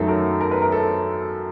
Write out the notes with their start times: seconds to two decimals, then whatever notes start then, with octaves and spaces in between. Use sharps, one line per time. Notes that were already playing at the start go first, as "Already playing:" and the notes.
Already playing: F#2 D#3 F#3 A3 A4
0.08 A#4
0.41 A#4
0.51 B4
0.62 A#4
0.72 A4